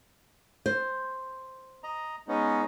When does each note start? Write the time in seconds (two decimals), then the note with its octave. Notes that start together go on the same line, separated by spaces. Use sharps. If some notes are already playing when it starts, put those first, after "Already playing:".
0.66 C5
1.83 D#5 A#5
2.28 G#3 B3 C#4 D#4